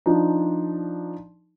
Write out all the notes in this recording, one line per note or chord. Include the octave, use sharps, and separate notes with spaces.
F3 D4 D#4